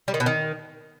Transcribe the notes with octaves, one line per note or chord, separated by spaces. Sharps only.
G3
D#3
B2
D#3